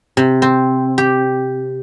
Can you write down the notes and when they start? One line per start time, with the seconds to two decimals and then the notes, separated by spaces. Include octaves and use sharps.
0.17 C3
0.42 C4
0.98 G4